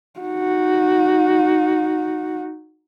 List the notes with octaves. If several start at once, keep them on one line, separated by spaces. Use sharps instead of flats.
D#4 F#4